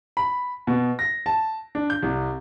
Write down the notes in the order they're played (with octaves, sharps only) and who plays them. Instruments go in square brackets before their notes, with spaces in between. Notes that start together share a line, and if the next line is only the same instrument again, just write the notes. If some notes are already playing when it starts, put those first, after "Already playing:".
[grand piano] B5
B2
A#6
A5
D4
G6
C2